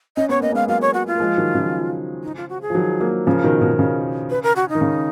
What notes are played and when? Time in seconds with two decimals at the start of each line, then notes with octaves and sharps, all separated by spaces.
0.17 C#4 D#5
0.29 B3 C#5
0.40 A#3 D#5
0.52 G#3 B3 F5
0.68 F#3 A#3 F5
0.81 C#5
0.94 F#4
1.07 F4
1.16 A#3
1.20 F3 G#3
1.38 D#3 F#3
1.54 C#3 F3
2.23 D#4
2.36 F4
2.49 F#4
2.61 G#4
2.70 F3
2.75 D#3 F#3
3.00 F#3 A#3
3.27 C#3 F3 A#4
3.44 B2 D#3
3.61 B2 D#3
3.72 B2
3.79 C#3
4.30 B4
4.43 A#4
4.56 F#4
4.69 D#4
4.75 D#3
4.81 C#3